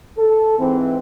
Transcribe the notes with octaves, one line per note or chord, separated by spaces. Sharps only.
A4
G#2 E3 C4